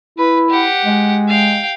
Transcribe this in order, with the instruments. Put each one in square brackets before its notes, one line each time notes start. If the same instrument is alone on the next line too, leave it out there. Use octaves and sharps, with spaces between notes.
[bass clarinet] E4 [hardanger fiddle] B4
[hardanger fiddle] G4 F#5
[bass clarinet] G#3
[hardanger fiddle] F5 G5